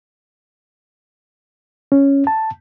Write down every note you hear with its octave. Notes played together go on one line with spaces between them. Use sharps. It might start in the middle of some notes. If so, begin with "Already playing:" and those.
C#4
A5